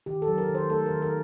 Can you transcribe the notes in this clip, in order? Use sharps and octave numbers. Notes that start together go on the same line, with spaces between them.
D#3 G4
A4
F#3
A#4
D#3
C5
A3 A4
A#4
D#3
A#4